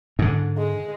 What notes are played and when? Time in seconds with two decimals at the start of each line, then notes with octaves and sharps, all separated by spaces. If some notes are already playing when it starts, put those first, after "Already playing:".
0.19 G#2 D3
0.58 G#3